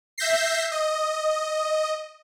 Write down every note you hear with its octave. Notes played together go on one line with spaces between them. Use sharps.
E5 G6 A#6 C7
D#5